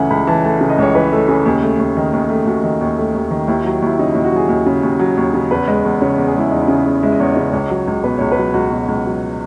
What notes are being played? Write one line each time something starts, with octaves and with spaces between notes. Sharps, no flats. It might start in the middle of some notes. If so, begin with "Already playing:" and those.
Already playing: C#2 C#3 E3 A3 E5 F#5 G#5
C#2 B5
E3 A5
A3 A5
C#3
D#5
C#2 C#5
E3 B4
A3 A4
C#3 G#4
D#2
A3
D#2
D#3
D#2
A3
D#2 F#4
D#3
D#2
A3
D#2
D#3
D#2 E4
E4
F#3
D#2 E4
C#3 D#4
E4
D#2
F#4
F#3 G#4
D#2
C#3
D#2
F#3
D#2
C#3
E2 B4
G#3
E2
C#3 C#5
E2
G#4
G#3 E4
E2 D#4
E4
C#3
E2
G#3 E5
D#5
E2 C#5
D#5
C#3
C#2 C#5
F#3
C#2
B2 B4
C#2 C#5
B4
F#3
C#2 F#4
B2
C#2
F#3